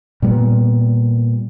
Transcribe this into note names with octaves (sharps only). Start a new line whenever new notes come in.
A#2 G3 G#3 B3